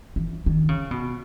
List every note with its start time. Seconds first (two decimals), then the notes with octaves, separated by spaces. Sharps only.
0.16 E3
0.46 D#3
0.69 C#3
0.91 B2